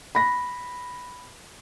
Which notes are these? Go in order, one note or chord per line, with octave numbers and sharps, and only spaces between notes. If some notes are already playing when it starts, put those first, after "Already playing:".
B5 A#6